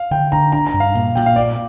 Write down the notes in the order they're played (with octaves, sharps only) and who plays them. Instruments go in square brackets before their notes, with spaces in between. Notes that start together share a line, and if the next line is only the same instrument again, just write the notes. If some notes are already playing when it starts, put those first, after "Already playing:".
Already playing: [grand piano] F5
[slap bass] D3 [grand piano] G5
[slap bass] D3 [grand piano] A#5
[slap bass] D4 [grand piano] A#5
[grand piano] A#5
[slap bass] G2
[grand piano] F5
[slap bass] A#2
[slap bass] A#2 [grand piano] G5
[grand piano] F5
[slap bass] A#3 [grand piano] D5